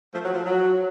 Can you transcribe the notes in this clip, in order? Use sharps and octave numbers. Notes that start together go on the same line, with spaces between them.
F3 A3
F#3
F3
F#3